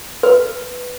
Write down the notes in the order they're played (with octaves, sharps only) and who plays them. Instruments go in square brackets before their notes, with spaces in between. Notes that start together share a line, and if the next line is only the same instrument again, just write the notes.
[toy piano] B4